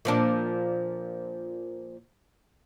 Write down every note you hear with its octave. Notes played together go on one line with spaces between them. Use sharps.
A#2 F3 D4